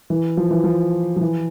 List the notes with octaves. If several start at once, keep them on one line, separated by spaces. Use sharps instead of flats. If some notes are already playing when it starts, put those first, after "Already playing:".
E3
F3
E3
F3
F3
E3